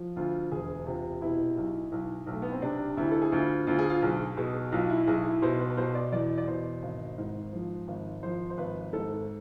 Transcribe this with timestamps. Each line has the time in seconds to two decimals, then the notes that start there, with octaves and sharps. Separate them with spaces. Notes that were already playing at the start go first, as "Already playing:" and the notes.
Already playing: F3
0.16 D2 F4
0.51 E1 G#4
0.86 C3 F4
1.21 B2 E4
1.57 B1
1.92 B1
2.27 B1
2.33 A3
2.42 B3
2.52 C4
2.62 C3 D4
2.97 D2 E4
3.12 A4
3.22 G#4
3.32 D2 F4
3.67 D2 F4
3.79 G#4
3.90 F4
4.02 B1 G#4
4.37 B2 G#4
4.72 B1 F4
4.90 E4
5.07 B1 G#4
5.25 E4
5.42 B2 C5
5.60 B4
5.70 B4
5.77 B2 C5
5.95 D5
6.12 E2 D5
6.38 D5
6.48 B2 C5
6.83 G#1
7.18 G#2
7.53 F3
7.88 G#1
8.23 F3 C5
8.50 C5
8.58 G#1 B4
8.93 G#2 A4